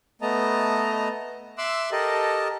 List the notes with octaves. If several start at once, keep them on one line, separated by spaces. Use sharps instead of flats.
A3 B3 D#5 A5 A#5
E5 C6 D6 E6 F#6
G4 A4 A#4 D#5 A5